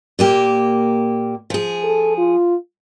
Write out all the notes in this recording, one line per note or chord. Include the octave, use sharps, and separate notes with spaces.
A#2 A#3 G4
F3 G#4
A4
F4